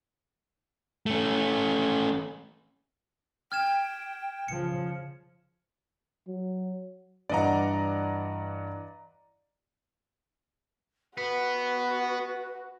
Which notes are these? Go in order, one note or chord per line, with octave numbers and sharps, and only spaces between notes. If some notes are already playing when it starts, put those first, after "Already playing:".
A3 C#4
G5 F6 G#6 E7
C#3 F3 C#7
F#3
G2 E3 D5 D#5 F#5 A#5
B3 F#4 B4